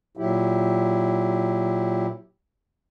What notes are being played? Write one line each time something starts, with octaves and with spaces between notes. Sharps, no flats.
A#2 F#3 E4 G4